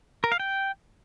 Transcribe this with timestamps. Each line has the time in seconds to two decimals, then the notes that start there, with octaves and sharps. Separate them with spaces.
0.24 A#4
0.32 F5
0.40 G5